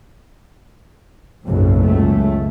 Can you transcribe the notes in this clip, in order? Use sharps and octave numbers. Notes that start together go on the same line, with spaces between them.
F#1 B1 G#2
C#2 A3